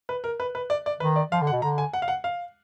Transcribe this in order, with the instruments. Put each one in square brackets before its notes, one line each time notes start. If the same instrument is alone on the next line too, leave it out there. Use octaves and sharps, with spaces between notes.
[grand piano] B4
A#4
B4
B4
D5
D5
[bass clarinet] D#3 [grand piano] B4
[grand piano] D5
[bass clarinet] F3 [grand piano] F5
[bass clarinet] D3
[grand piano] F#5
[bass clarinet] B2
[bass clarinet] D3 [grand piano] A#5
[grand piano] G#5
F#5
F5
F#5
F5